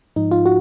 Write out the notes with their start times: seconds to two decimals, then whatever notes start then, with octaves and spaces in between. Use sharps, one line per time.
0.16 G#2 F3 D#4
0.32 F4
0.46 F#4